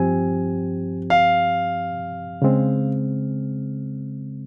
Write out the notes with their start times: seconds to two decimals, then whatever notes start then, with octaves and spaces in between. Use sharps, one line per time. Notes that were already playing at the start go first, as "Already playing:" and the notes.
Already playing: G2 F3 C4 G4 G#5
1.10 F5
2.42 C#3 G#3 C4